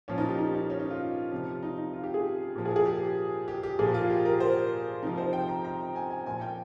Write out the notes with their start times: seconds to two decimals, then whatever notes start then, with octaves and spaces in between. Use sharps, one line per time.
0.08 A#2 F3 C#4
0.18 D#4
0.29 G4
0.39 D#4
0.54 D#4
0.70 C#4
0.80 D#4
0.91 F4
1.32 C3 F3
1.63 D#4
1.78 D#4
1.93 F4
2.03 G4
2.14 G#4
2.56 A#2 F3
2.65 G#4
2.76 G#4
2.86 G4
3.48 G4
3.63 G4
3.79 A#2 F3 G#4
3.94 F4
4.10 G4
4.25 A#4
4.40 C5
5.02 C3 F3 D#4
5.18 C5
5.33 G5
5.49 A#5
5.65 A#5
5.96 G#5
6.10 G#5
6.26 A#2 F3 G#5
6.41 G5